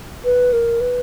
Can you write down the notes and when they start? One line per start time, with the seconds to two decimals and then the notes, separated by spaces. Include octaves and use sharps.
0.25 B4
0.53 A#4
0.81 B4